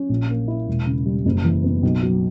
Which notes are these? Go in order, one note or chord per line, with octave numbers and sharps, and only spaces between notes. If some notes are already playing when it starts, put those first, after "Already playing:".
Already playing: C#4
A#1
A#3
E4
E1
C#3
G3
F#1
E3
B3
B1
F#3